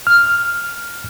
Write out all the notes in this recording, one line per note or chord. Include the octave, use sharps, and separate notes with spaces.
F6